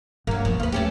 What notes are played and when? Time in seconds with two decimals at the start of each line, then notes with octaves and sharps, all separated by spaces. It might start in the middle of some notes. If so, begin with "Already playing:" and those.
0.27 G2 F#3 A#3
0.45 D#2 B2 F3
0.60 D#2 F4 B4
0.72 A3 C#4 G4